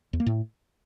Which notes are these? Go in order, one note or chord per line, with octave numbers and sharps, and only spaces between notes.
E2
A#3
A2